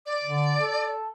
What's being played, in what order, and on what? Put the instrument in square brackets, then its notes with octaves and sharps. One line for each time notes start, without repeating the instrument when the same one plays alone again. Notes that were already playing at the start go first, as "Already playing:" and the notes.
[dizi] D5
[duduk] D3
A4